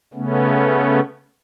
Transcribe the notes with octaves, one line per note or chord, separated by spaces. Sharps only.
C#3 A3 B3 C#4